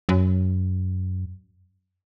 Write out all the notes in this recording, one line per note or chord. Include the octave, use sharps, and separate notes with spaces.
F#2